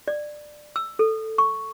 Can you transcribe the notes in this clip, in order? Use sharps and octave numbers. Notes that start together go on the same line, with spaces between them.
D5
E6
A4
C#6